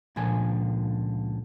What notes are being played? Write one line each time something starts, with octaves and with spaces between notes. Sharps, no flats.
C#2 A#2 D3 F3 G#5